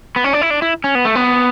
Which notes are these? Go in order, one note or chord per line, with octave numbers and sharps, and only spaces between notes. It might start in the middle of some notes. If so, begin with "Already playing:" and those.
B3
C#4
D4
E4
D4
E4
C#4
B3
A3
B3